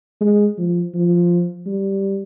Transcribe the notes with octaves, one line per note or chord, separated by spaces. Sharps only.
G#3
F3
F3
G3